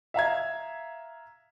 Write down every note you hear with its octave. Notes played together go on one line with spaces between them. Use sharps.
E5 F5 A#5 G#6